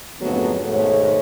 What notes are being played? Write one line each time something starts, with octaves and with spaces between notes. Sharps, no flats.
F2 G#2 D3 F#3 A3 B3
D#2 G#2 B2 A3 C#5